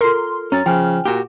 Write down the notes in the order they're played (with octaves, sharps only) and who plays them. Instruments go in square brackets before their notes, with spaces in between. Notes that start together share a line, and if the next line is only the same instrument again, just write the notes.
[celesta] F4 A4 F6 [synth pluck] A#4 C6
[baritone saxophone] F#2 [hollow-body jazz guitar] C#4 [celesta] A#5 A6
[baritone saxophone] C#3 [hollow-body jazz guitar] F3 [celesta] G5 G#5 F6
[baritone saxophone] A#2 [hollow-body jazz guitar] F#4 G4